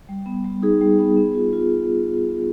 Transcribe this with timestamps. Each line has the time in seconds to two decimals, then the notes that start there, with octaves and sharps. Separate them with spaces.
0.09 G3
0.26 B3
0.44 G3
0.62 D#4 G#4
0.81 G3
0.99 B3
1.16 B3
1.35 F4
1.53 F4